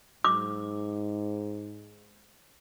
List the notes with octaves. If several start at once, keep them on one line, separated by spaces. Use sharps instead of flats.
G#2 D6